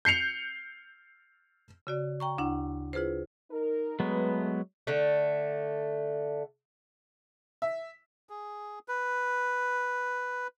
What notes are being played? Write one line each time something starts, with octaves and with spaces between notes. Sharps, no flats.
G6 C7 C#7 F7
C#3 F#4 D5
G5 A#5 C#6
D2 D4 E4 F#5
E4 F4 G#4 B4 C5
D#4 A#4
F#3 G#3 A3 B3 B4
D3 A3
E5
G#4
B4